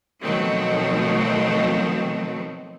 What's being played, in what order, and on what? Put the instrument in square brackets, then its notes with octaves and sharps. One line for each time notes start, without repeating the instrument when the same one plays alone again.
[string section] B2 D#3 F3 F#3 A3 C4